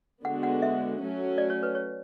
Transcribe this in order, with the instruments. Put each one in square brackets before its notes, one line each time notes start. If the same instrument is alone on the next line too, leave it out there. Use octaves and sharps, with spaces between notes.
[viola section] D3 G#3 B3 F#4 [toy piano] F#5
[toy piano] F#5
E5
[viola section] F#3 A3 C#4
[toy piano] D5
C#5
B4
C#5